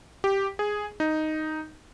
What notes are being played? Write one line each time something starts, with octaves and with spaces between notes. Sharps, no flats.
G4
G#4
D#4